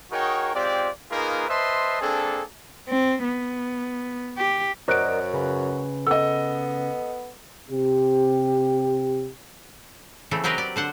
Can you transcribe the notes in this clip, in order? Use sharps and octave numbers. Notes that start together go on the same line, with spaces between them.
D#4 F#4 G#4 A#4 C#5 G5
G#3 C4 F4 G4 D5
A#3 D#4 F4 G#4 A#4 B4
B4 C5 D#5 E5 A5 C6
A#3 C4 D4 G#4 A4
C4
B3
G4
F#2 F#4 A#4 C5 D5 D#5 F#6 D7
C#3 C#4 B4
B3 A4 D#5 E6
C3 G4
C#3 E3 A3 C4
F#3 C4 G4 A#4 B4 D#5
D5
D3 C5 F#5